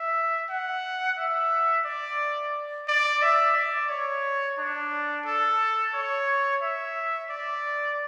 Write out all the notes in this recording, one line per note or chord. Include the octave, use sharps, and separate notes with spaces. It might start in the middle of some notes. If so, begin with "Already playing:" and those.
Already playing: E5
F#5
E5
D5
D5
E5
D5
C#5
D4
A4
C#5
E5
D5